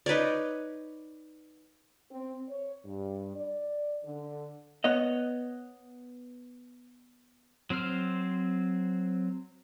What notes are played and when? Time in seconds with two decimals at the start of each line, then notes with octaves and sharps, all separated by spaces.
0.06 D#4 B4 C#5 D5
2.10 C4
2.48 C#5
2.85 G2
3.35 D5
4.04 D3
4.84 B3 C#5 D#5
7.70 F#3 C4 C5 F6